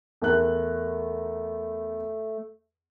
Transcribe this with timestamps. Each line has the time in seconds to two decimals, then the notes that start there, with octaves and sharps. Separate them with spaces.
0.22 E2 A3 A#4 F#6